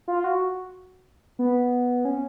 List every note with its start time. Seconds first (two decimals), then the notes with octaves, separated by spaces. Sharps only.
0.08 F4
0.24 F#4
1.39 B3
2.05 C#4